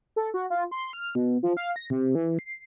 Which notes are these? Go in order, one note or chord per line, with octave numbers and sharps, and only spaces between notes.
A4
F#4
F4
C6
F6
B2
F3
F5
A#6
C3
E3
C7